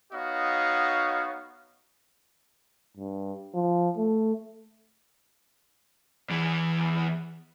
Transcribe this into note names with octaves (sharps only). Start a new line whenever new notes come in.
B3 D#4 F#4 C#5 D#5 F5
G2
F3
A3
E2 E3